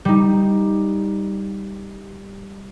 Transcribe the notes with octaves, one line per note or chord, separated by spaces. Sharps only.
G3 D#4